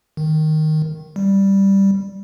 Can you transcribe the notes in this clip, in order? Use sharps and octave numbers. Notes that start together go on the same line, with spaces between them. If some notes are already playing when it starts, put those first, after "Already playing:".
D#3
G3